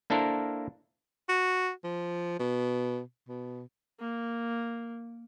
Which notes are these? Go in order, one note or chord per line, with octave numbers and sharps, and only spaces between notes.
A#3 D4 E4 A4 A#4 C5
F#4
F3
B2
B2
A#3